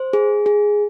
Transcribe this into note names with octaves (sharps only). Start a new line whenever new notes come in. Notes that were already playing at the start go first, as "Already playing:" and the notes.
Already playing: C5
G#4
G#4